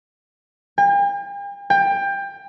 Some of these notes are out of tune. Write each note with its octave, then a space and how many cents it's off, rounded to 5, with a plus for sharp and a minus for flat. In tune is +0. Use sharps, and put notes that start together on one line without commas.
G5 +45
G5 +20